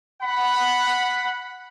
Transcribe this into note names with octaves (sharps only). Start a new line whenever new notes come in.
F#5 B5